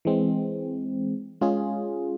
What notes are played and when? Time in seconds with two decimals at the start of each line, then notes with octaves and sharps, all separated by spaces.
0.05 E3 G#3 C4
1.41 G#3 C#4 F4 G#4